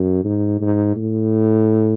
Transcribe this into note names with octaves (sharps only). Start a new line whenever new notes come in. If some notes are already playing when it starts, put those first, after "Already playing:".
Already playing: F#2
G#2
G#2
A2